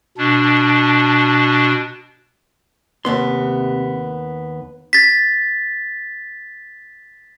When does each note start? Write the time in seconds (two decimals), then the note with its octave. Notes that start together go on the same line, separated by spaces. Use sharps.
0.18 B2 D4
3.05 D#2 C3 B3 C6
4.93 A6 B6